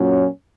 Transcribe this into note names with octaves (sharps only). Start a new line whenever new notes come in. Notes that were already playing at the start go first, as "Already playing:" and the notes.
Already playing: A#2 F#3 C#4